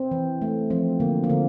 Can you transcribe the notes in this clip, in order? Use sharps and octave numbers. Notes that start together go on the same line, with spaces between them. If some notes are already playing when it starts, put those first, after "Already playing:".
Already playing: C4
E3
A3
F3 C4
D3 A#3
A#3
D3 C4